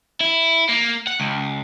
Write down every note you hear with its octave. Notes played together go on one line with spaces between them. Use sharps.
E4
A#3
F#5
C#2